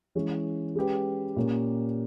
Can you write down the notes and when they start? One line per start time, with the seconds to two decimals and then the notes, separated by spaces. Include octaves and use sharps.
0.15 E3 G#3 C#4
0.76 G#3 C#4 G4 B4
1.36 A#2 A#3 C#4 G4